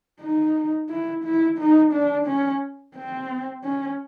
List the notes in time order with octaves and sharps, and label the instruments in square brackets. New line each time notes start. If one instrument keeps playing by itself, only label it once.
[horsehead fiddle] D#4
E4
E4
D#4
D4
C#4
C4
C#4